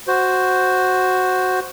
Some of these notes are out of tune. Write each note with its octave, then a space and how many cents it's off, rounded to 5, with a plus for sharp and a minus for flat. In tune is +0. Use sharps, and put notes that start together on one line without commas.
F#4 +0 C5 +0